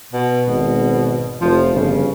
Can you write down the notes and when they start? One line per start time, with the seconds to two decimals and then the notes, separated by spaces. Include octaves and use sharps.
0.13 B2
0.48 G#1 B2
1.41 F1 F3
1.74 G1 C#3